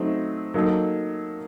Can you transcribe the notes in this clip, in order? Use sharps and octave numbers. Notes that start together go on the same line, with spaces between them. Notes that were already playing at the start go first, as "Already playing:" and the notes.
Already playing: F#3 A3 C4 D#4
F#3 A#3 D#4 A4